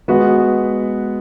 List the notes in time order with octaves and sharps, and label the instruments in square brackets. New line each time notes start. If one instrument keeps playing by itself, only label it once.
[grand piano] G#3 B3 F#4 B4